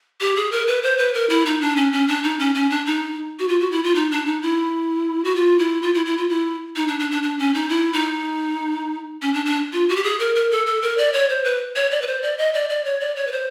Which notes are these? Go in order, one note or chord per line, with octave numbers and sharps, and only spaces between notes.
G4
G#4
A#4
B4
C5
B4
A#4
E4
D#4
D4
C#4
C#4
D4
D#4
C#4
C#4
D4
D#4
F#4
F4
F#4
E4
F4
D#4
D4
D#4
E4
F#4
F4
E4
F4
E4
E4
F4
E4
D#4
D4
D4
D4
D4
C#4
D#4
E4
D#4
C#4
D4
D4
F4
F#4
G4
G#4
A#4
A#4
A4
A4
A#4
D5
C#5
C5
B4
C#5
D5
B4
C5
D5
D#5
D5
D5
C#5
D5
C#5
B4
C5